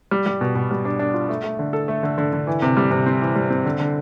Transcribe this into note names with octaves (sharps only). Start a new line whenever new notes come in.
G3
G3
B2
B2
G3
D4
D4
F4
A3
A3
D3
A4
A3
D3
D3
D3
E3
C3
G3
C3
C4
E3
G3
C4
D3
D3